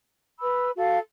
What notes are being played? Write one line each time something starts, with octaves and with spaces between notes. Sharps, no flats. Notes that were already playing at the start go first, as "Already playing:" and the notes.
B4 B5 E6
F#4 A4 F5